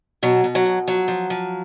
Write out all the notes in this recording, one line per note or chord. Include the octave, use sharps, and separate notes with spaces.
B2 F#3
B2
F#3
B2
F3 F#3
F3
F3